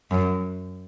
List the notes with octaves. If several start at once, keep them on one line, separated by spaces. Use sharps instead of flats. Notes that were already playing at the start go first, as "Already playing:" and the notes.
F#2